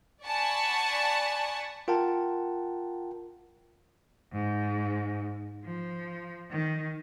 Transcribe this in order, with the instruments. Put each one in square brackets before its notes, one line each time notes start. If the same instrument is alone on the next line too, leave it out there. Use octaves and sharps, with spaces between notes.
[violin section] D5 F#5 G#5 A5 B5 C#6
[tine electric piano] F4 A#4 F#5 G5 A5
[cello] G#2
F3
D#3